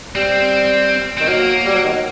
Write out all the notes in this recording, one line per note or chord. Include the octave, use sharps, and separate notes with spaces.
G3 C4
D#3 C4
F#3 A#3
G3
F#3
D#3
F#3